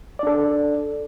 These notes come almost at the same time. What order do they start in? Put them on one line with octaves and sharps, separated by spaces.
D5 D4 A4